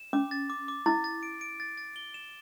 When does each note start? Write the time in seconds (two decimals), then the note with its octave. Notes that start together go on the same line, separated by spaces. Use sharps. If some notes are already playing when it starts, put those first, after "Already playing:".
Already playing: E7
0.13 C#4 D6
0.31 A6
0.50 D6
0.68 D6
0.86 E4 A6
1.04 A6
1.23 D7
1.41 D7
1.60 A6
1.78 A6
1.96 G7
2.14 E7